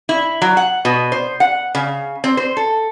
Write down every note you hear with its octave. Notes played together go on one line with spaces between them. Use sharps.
E4
F#3
F#5
B2
C5
F#5
C#3
C4
C5
A4